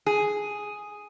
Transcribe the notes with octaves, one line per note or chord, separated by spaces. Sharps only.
G#4